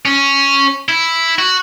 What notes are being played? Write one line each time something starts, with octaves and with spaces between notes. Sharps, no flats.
C#4
E4
F#4